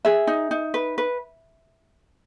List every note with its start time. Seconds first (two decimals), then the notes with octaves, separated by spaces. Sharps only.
0.05 G#4 E5
0.27 D#4
0.51 D#4
0.74 B4
0.98 B4